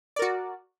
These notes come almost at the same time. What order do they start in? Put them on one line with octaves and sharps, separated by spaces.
D5 A#4 F#4